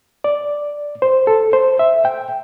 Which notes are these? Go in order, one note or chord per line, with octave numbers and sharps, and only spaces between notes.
D5
C5
A4
C5
E5
G5